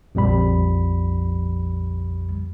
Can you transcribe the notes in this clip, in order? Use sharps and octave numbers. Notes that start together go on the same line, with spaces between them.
A#1 F2 G3 B5